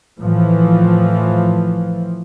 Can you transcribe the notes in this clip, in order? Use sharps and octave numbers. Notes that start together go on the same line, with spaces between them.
A2 E3 F3